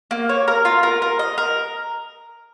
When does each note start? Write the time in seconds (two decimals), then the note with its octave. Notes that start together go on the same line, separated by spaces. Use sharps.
0.11 A#3
0.29 C#5
0.48 A#4
0.65 F4
0.83 A#4
1.02 A#4
1.19 D#5
1.38 A#4